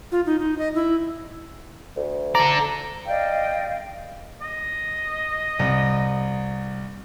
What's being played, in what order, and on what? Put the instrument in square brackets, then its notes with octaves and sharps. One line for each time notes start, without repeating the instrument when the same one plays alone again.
[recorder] F4
D#4
D#4
D#5
E4
[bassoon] D2
[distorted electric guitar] A4 D5 [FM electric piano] A#5
[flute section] D5 D#5 G5 [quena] F5
[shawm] D#5
[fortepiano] C2